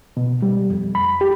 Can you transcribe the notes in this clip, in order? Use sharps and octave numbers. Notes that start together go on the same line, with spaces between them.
B2
G3
F2
B5
G4